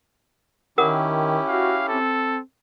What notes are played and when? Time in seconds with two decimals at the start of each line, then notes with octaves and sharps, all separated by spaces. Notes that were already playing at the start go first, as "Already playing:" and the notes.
0.78 D#3 C#4 E4 G4 A#4 F#5 D#6
1.48 F#4 F5
1.88 C4 A4